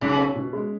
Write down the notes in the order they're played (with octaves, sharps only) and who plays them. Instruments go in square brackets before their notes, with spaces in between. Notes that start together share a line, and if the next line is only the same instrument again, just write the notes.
[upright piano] B1 [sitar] C#3
[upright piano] C#4
B2
G#3